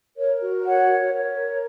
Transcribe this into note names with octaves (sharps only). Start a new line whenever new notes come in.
A#4 C#5
F#4
C#5 F#5
A#4
C#5
A#4